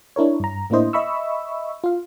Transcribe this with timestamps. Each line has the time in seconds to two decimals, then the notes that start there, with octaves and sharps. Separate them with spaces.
0.16 D4 E4 A#4 C#5
0.40 G2 A#5
0.70 A2 A#3 D4 E4 C5 D#5
0.93 D#5 E5 B5 C#6 E6
1.84 F4 F5